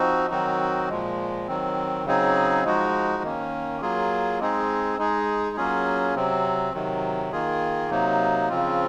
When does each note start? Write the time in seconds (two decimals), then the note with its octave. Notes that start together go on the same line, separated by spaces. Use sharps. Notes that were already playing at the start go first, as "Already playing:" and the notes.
Already playing: F3 C4 D#4 F#4
0.30 D#3 F#3 C4 D#4 F#4
0.89 A#2 F3 G#3
1.47 D#3 F#3 C4
2.06 C#3 F#3 C4 D#4 G#4
2.64 F3 G#3 D#4 F#4
3.23 D#3 A#3 C#4
3.81 F#3 A#3 F4 G#4
4.39 G#3 C4 D#4 G#4
4.98 G#3 D#4 G#4
5.56 F#3 A#3 C#4 F4 G#4
6.15 C3 F#3 C4
6.73 C3 D#3 F#3
7.32 D#3 A#3 F4 G#4
7.90 C3 F#3 A#3 D#4
8.49 C#3 F3 C4 F4